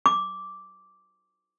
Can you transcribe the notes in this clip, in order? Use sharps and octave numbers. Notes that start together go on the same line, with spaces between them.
D6